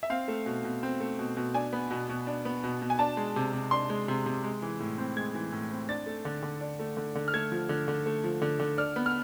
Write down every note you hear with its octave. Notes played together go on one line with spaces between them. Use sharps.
E5
C4 F5
A3
B2
B2
C4
A3
B2
B2
D4 G#5
B3
B2
B2
D4
B3
B2
B2
G#5
D4 A5
G#3
C3
C3
D4 C6
G#3
C3
C3
G#3
E3
A2
C4
G#3 G#6
E3
A2
C4
D4 A6
A3
D3
D3
D4
A3
D3
D3
F6
A3 G#6
F3
D3
D3
A3
F3
D3
D3
D4 F6
B3
F6